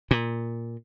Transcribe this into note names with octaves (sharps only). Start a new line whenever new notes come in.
A#2